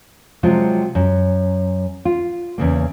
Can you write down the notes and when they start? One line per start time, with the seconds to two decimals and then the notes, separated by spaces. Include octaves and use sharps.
0.43 C3 F3 F#3 G#3 F4
0.95 F#2
2.05 F4
2.58 E2 C#3 A#3